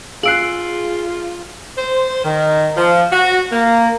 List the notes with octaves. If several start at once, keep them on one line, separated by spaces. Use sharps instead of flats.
F4 G#4 F5 E6 F#6 C7 D7 F#7
C5
D#3
F3
F#4
A#3